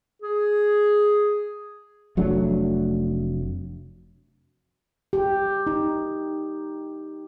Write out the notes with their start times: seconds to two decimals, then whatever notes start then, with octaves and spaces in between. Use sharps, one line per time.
0.22 G#4
2.17 F1 F#3 A3 D4
5.13 G4
5.67 D#4